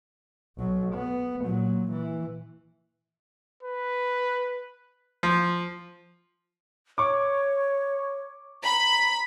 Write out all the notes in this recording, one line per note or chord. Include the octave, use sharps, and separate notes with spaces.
B1 F#3
B3
A#2 F#3
E3
B4
F3
C#5 C#6 D6
A#5 B5